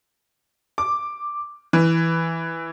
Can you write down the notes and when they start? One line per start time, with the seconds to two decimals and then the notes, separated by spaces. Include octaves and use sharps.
0.78 D6
1.73 E3